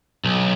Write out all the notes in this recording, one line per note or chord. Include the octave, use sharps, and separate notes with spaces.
B1